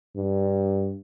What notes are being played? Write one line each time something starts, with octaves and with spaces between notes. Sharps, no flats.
G2